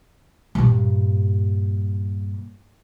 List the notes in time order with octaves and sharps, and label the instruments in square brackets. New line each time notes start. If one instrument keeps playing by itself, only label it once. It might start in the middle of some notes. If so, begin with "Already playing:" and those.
[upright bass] G2 A#2